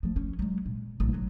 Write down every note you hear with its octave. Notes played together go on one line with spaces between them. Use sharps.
F3 A3
C#4
F#3 G#3
A#2
A1 F#3
F3 F#3